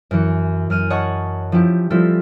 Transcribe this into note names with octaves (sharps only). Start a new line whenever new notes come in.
F#2 E3 C#7
F#2 F6 D#7
C#5 D#5 F#5 A5 C#6
F3 C#4 E4 G4
F3 G3 C4 E4 F4 A4